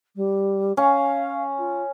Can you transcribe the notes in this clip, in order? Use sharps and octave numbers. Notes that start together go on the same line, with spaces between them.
G3
C#4 F5
F4